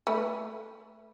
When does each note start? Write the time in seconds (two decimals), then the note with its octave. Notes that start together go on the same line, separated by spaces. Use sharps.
0.07 A3 B4